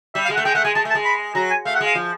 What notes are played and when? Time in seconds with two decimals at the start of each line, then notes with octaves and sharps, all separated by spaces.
0.15 G3 E5
0.25 F5
0.30 G#3
0.35 A3 F#5
0.45 G#3 G5
0.55 A3 F#5
0.65 G#3 G#5
0.75 G#3 A5
0.85 A3
0.90 A5
0.95 G#3
1.05 B5
1.35 F#3 A#5
1.51 G#5
1.65 A3 F5
1.75 F#5
1.80 G#3 F5
1.95 F3